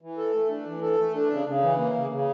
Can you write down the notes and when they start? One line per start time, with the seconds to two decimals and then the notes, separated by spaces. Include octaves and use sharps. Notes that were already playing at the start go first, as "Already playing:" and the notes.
0.01 E3
0.17 A4
0.34 A3
0.49 D4
0.65 E3
0.82 A4
0.98 A3
1.14 D4
1.30 C#3
1.46 C#3
1.62 E3
1.78 A#3
1.94 C#3
2.11 C#3